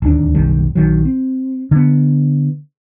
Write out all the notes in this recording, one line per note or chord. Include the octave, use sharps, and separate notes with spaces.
D1 D#2 D4
F#1 B1 D#3 G3
A#1 D#3 F#3
C4
D3 B3